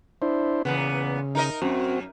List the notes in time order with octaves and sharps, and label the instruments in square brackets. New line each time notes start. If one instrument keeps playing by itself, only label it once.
[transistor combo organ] D4 E4 C5
[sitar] E2 A#2 B3 [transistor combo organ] C#3
[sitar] D#4 A#4 D#5
[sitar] F#2 [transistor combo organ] C4 F#4